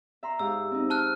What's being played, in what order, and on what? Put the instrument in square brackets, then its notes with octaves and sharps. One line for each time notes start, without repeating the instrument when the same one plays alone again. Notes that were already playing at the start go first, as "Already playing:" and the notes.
[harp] E5 A#5 C6
[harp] G#2 G4 F5 [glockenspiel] E6
[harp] C4 D#4
[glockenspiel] A5 F6 F#6